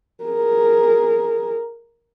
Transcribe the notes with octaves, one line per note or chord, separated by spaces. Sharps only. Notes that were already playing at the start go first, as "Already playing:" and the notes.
G#4 A#4